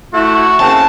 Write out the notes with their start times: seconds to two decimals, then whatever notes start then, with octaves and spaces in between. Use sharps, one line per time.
0.13 A3 E4 F#4
0.60 C#3 A#3 C4 A5